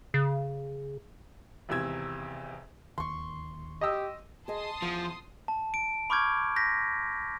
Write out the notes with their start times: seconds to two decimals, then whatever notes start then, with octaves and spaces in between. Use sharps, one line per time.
0.14 C#3
1.69 G#1 E2 C3 E6 G#6
2.98 D1 D#2 D#3 C6 C#6
3.81 G4 D#5 D#6 E6
4.48 G#4 D#5 A5 C6 D#6
4.82 E2 F3
5.48 A5
5.74 D7
6.10 B5 C#6 D6 F6 G6 G#6
6.56 G6 A#6 B6